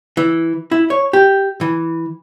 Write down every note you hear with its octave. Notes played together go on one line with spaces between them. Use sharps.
E3
E4
C#5
G4
E3